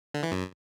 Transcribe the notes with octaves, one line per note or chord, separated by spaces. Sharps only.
D3
E3
F#2